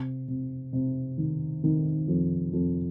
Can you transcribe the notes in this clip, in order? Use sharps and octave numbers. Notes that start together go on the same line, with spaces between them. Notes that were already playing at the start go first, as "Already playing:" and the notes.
Already playing: C3
C3
C3
D#3
D#3
F2
F2